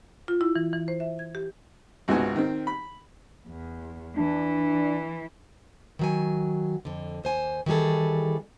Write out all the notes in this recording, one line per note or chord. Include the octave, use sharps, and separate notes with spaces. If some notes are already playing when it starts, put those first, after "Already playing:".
F4
E4
E3
E3
C5
E5
G#6
G4
G#1 C#2 C3 B3 F#4 G#5
D#3 C4
B5
E2
E3 D4
D#3 F#3 G#5
F2 D3
D#2 C5 G#5
D#3 E3 G3 G#4 A4